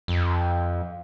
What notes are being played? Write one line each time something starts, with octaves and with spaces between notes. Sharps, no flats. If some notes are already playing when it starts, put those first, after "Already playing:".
F2